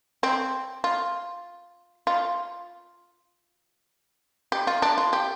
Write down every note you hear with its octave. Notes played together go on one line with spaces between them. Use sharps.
C4
F4
F4
G4
F4
D4
F4
G4